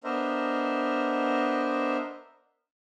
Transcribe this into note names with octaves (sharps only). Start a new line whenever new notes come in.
B3 D4 A#4 C5 D#5 E5